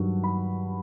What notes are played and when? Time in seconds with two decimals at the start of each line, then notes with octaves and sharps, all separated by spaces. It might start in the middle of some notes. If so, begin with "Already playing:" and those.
Already playing: G2 D#3 F#3
0.24 B5